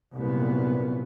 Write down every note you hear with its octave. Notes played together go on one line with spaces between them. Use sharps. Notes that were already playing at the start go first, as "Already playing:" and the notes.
C2 F#2 A#2 B3